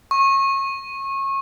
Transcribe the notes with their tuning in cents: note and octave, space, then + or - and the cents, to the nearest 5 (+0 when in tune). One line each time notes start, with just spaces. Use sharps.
C#6 -30